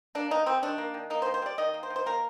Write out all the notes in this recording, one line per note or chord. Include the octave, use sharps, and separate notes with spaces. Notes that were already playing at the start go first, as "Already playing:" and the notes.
A#3 D4
D#3 D#4
G3 C4
D#3 D4
A#3
D#3
A#3 D#4
C5
D#3
C5
G3 D5
D#3 D#5
A#3
C5
D#3
C5
A#3 A#4